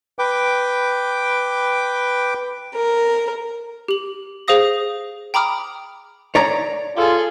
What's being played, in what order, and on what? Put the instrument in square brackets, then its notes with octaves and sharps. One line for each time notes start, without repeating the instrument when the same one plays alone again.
[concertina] B4 G5 D6
[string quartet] A#4
[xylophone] G4 F#7
G#4 C5 F5 D#6 A#6
G5 A#5 B5 D6 D#6 F6
[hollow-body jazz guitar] C#5 D5 A#5
[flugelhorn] F4 [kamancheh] G#4 A4